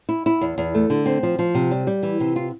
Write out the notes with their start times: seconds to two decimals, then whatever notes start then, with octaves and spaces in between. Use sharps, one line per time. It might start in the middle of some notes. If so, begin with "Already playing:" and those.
0.09 E4
0.26 E4
0.41 E2
0.58 E2
0.75 A3
0.90 D3
1.06 C4
1.23 F3
1.39 F3
1.55 C3
1.71 G3
1.87 G3
2.03 E3
2.20 C3
2.36 F4